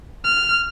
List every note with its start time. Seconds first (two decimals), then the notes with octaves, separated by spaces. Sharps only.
0.24 F6